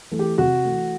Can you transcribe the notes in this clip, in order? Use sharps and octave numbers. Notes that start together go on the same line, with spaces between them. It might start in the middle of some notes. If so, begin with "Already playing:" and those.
E3 A3
G4
C3 F#4
E3 A3